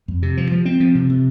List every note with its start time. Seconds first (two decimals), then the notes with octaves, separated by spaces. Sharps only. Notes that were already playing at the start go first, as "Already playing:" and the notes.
0.08 F2
0.23 C3
0.37 F3
0.52 F3
0.65 C4
0.80 F3
0.95 C3
1.10 C3